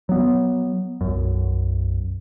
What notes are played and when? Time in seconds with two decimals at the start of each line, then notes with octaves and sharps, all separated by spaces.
0.09 F#3 B3
1.01 B1 F#2